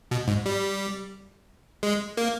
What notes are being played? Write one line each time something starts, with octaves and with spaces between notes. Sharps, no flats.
B2
G#2
G3
G#3
A#3